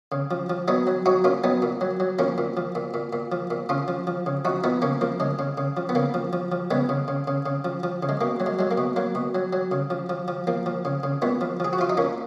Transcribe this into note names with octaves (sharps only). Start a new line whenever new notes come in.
C#3
F3
F3
F#3 B3 D#4
F#3
F#3 D#4 F#4
A#2 C#4 F4
F#3 B3 D#4
A#2
F#3
F#3
F3 A#3 C#4
A#2
F3
A#2
A#2
A#2
F3
A#2
C#3 C#4 F4
F3
F3
C#3
F3 D#4 F#4
F3 B3 D#4
C#3 A#3 C#4
F3 A#3
C#3 G#3
C#3
C#3
F3
B3
C#3 A#3
F3
F3
F3
C#3 G#3 B3
C#3
C#3
C#3
C#3
F3
F3
C#3
G#3
B2 A#3
F#3
G#3
F#3 G#3
A#3
B2
F#3 A#3
B2
F#3
F#3
C#3
F3
F3
F3
F3 A#3
F3
C#3
C#3
A#2 G#3 B3
F3
F3 G#4
F#4
F3 F4
D#4
A#2 A#3 C#4